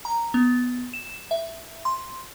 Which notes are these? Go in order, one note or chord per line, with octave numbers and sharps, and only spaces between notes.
A#5
B3
E7
E5
C6